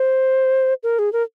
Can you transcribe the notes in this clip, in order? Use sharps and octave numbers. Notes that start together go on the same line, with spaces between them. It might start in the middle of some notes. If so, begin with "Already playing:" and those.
Already playing: C5
A#4
G#4
A#4